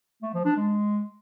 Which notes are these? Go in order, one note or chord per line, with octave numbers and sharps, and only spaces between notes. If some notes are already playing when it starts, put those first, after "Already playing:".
A3
F3
D4
G#3